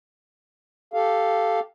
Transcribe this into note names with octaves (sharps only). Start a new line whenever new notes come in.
G4 A4 F5